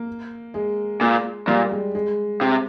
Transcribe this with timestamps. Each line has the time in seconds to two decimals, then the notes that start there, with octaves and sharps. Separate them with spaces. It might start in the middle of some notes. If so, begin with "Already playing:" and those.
Already playing: A#3
0.54 G#3
1.01 A#2
1.48 A#2 G3
1.71 G#3
1.95 G#3
2.41 C3